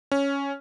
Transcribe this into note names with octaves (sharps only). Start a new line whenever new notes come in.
C#4